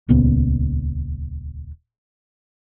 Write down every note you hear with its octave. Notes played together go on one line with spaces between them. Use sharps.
D#1 C#2 A#2 B3